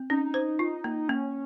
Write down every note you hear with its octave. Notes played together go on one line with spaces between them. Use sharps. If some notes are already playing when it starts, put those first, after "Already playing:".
Already playing: C4
C#4 D#4
C5
F4
A#3
A#3 C#4